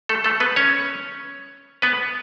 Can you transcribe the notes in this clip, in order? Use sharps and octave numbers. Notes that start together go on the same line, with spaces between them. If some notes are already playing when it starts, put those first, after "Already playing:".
A3 A4
A3 A4
B3 B4
C#4 C#5
B3 B4